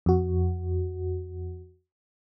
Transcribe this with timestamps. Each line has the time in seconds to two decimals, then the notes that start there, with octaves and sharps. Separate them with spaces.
0.06 F2 F#4